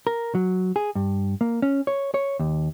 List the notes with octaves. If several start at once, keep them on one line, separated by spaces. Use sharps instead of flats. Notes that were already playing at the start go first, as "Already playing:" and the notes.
A#4
F#3
G#4
G2
A#3
C#4
C#5
C#5
D#2